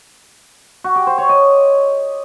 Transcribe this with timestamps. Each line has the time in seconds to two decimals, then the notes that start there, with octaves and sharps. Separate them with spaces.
0.84 F#4
0.96 G4
1.07 C5
1.18 C#5
1.29 D#5